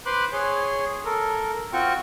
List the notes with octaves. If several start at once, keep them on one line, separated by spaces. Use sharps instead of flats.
B4 C5 B5 C6 D6 F#6
G#4 C#5 C6
A4 A#4
C4 F4 F#4 G5 C#6